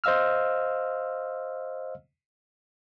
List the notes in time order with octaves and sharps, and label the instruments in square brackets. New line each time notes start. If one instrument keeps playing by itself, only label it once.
[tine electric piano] C5 D#5 F5 E6 F6